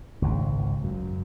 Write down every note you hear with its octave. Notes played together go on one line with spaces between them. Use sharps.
G#1 C#2
F#2